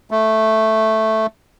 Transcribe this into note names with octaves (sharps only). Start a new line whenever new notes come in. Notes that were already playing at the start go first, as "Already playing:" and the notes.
A3